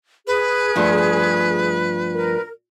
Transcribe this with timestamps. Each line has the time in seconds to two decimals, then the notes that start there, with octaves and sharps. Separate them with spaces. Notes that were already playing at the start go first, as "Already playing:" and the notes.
0.27 G#4 B4
0.75 G2 F3 A3
2.14 A#4